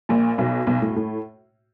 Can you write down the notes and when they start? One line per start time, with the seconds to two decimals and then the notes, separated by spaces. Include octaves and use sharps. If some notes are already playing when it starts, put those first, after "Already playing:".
0.09 A#1 A#2
0.38 B1 B2
0.67 B1 B2
0.82 A2
0.96 A2